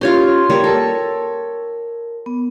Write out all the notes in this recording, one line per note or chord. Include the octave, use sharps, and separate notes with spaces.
C#4 F4 G4 C#5 C6
G3 A#3 C#5
A4 A#4
B3